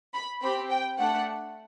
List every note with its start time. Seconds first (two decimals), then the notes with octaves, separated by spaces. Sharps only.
0.14 B5
0.41 C4 G4 B5
0.70 G5
0.98 A3 D4 A4 F#5